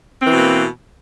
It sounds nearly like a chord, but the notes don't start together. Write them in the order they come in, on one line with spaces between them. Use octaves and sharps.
C4 E3 B2 A#3